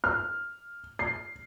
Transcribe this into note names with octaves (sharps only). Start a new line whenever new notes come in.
F6
C7